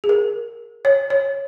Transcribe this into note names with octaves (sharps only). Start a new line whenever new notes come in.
G#4
A#4
C#5
C#5